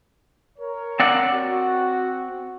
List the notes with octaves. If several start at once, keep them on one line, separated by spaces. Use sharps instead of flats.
A#4 C#5
C4 D5 F#5
F#4